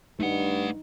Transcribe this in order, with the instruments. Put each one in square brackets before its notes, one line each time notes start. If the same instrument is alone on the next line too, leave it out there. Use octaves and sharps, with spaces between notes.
[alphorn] G2 [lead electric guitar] A3 F#5 [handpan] D#4